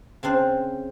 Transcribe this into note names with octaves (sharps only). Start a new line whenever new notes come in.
C#3 C4 D4 C5